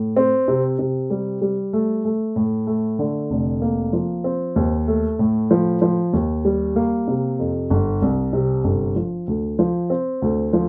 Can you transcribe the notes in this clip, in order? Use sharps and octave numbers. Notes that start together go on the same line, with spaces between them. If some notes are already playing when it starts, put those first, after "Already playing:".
Already playing: A2
C4
C3
C3
G3
G3
A3
A3
A2
A3
D3
F1
A#3
F3
C4
D#2
A3
A2
F3
F3
D#2
G3
A#3
C3
F2
G1
C2
C3
G1
F3
D2
F3
C4
D2
F3